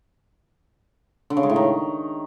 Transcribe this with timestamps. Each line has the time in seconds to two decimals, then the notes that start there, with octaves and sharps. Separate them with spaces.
1.30 D3
1.37 C#3
1.43 G#3
1.50 A2
1.56 D#3